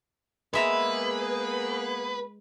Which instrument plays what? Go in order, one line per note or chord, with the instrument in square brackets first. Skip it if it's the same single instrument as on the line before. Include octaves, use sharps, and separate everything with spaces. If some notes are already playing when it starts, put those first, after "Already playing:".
[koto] G#3 E5 A#5 [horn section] A#3 B3 G#4 [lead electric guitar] B4